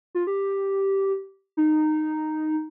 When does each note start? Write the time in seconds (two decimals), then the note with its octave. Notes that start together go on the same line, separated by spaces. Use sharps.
0.15 F4
0.27 G4
1.57 D#4